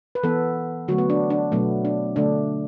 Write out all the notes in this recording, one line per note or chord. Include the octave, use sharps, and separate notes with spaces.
B4
E3 B3 A4
D3 F#3 A3 F#4
B3
D4
D4
B2 F#3 A3 B3
D4
D3 A3 D4